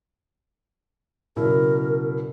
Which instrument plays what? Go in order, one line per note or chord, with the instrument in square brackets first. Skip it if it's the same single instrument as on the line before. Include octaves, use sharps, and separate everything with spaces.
[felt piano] F#1 B2 E4 [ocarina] A#4